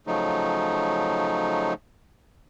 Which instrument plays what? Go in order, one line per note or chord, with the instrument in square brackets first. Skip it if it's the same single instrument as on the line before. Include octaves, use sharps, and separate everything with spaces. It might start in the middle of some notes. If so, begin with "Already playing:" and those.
[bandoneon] C#3 F3 F#3 A3 D#4